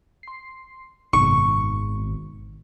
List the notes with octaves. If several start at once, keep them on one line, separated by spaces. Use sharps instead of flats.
C6 C7
G#1 F#2 B2 D#3 C#6